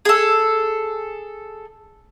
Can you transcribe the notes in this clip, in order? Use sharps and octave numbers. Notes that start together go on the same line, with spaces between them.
G#4 A4